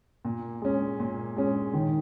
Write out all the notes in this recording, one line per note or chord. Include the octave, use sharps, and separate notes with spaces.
A#2
G#3 C#4
A#2
G#3 C#4
D#3